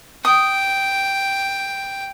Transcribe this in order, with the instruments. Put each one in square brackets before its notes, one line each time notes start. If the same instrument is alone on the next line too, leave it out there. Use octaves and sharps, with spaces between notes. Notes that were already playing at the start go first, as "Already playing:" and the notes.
[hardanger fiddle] G5 [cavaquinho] D#6